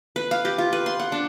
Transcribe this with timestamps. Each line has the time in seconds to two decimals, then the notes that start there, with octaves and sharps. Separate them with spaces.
0.16 B4
0.31 F5
0.45 G4
0.58 F4
0.73 B4
0.86 C6
0.99 F#5
1.12 D4